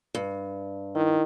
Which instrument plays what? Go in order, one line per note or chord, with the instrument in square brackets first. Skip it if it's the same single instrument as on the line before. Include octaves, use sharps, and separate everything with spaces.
[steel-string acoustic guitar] G2
[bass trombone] D#3 [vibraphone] E4